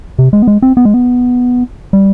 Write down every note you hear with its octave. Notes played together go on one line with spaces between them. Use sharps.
C3
G#3
B3
G#3
C4
B3
G#3
B3
G3